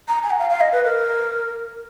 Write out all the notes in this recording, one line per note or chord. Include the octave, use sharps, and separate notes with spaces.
A#5
G#5
F#5
F5
F5
D#5
B4
A#4